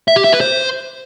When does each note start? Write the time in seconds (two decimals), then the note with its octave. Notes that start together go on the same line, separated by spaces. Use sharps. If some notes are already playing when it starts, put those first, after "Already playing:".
0.08 E5
0.16 G4
0.24 E5
0.33 B4
0.41 C5